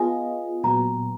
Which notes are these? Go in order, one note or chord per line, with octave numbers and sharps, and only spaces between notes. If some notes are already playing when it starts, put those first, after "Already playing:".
Already playing: B3 F4 G#4 D#5 G#5
A#2 F#3 B3 A#5